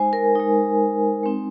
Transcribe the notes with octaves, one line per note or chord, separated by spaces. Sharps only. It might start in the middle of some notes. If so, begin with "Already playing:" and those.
Already playing: G#3 D#4 C5 G#5
A#4
G#3 D#4
G#3 C4 D#4